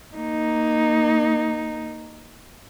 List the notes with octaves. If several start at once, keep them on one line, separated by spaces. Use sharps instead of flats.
A#3 D#4